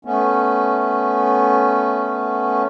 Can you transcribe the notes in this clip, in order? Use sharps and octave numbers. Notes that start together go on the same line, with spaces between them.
A3 B3 C#4